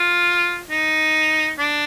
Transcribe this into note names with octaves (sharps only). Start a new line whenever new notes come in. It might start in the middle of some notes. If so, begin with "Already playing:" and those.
Already playing: F4
D#4
D4